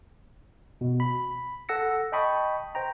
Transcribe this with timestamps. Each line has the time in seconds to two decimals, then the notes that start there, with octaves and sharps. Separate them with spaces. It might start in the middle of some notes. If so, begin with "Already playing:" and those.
0.81 B2
1.00 B5
1.69 A4 F#5 E6 A#6 C#7
2.12 D#5 G5 A5 B5 C#6 D#6
2.75 C5 G5 A#5